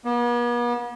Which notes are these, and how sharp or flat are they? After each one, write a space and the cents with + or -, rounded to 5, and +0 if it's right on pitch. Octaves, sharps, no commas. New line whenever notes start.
B3 -45